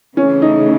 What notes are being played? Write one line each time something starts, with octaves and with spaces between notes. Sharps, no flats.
C#3 E3 A3 C#4
D#4